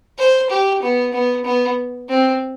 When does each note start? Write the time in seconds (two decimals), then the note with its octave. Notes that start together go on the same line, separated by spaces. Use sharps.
0.18 C5
0.50 G4
0.82 B3
1.13 B3
1.45 B3
2.09 C4